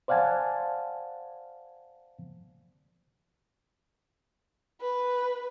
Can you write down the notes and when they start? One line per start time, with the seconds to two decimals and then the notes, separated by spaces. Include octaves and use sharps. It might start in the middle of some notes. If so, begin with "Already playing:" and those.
0.08 C5 D5 F5 F#5 G#5 A5
4.81 B4